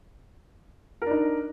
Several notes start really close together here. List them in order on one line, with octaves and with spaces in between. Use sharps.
A#4 D4 D#4